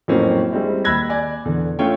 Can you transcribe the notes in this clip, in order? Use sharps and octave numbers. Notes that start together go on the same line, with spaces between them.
F2 A2 F#3 A#3 C4 C#4
G3 G#3 C4 E4
D#2 B5 E6 F#6 G#6 A#6
D5 G#5
E2 D3
A3 C#4 F4 C#5 G5